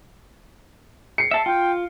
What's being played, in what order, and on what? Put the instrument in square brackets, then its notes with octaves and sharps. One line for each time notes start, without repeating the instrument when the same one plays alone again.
[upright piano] C7 C#7
[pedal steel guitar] E5 A5
[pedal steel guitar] F4 [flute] G5